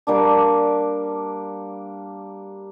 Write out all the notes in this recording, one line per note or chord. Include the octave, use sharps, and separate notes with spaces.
G3 A#3 D4